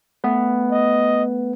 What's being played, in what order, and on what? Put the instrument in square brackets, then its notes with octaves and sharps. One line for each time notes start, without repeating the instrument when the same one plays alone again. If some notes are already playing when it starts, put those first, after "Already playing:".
[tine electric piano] A3 B3 B4
[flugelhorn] D#5